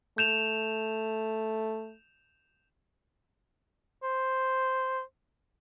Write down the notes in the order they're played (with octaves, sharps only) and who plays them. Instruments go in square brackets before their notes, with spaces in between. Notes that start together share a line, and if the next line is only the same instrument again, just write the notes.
[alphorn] A3 [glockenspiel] G6 E7 F7
[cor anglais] C5